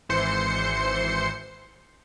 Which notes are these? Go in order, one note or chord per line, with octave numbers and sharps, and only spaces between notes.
G#1 E3 C5 C6 C#7